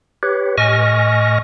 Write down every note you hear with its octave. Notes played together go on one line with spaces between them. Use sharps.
G4 B4 C#5
A2 D#5 G#5 C#6 F6 A#6